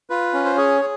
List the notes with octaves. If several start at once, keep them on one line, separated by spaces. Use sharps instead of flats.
F4 B4
C#4
C5
G#4 C#5
G#4